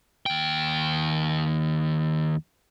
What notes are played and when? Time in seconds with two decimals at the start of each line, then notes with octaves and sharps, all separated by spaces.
0.26 D#2 G5